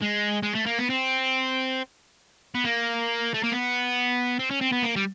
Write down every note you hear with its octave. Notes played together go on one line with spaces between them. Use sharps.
G#3
G#3
A3
A#3
B3
C4
B3
A#3
A3
A#3
B3
C4
C#4
C4
B3
A#3
G3